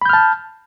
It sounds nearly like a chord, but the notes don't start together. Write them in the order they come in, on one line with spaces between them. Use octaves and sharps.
B5 G6 F6 A5